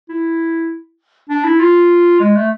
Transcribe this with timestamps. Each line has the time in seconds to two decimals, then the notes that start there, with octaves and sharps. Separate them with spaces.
0.09 E4
1.29 D4
1.44 E4
1.60 F4
2.20 G#3
2.36 A3